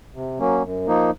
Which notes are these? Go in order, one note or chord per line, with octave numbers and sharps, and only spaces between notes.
C3
F#3 A#3 C#4
F#2
F3 A#3 D#4